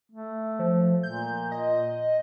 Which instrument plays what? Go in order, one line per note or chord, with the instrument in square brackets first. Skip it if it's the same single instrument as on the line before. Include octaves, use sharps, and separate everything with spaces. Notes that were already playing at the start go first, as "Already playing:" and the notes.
[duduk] A3
[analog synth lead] F3
[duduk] A#2 [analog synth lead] G6
[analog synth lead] D#5